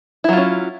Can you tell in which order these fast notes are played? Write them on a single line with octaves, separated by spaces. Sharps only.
E4 F#3 F4 C#4